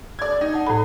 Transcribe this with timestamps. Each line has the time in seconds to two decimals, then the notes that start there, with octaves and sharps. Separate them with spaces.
0.19 D5 G#6
0.41 D#4 G5
0.52 F#5 A5 D#6
0.67 A2 A4 C5 B5